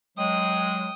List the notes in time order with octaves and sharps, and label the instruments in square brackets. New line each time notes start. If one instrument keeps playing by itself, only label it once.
[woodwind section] F#3 G#3 [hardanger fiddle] G5 D#6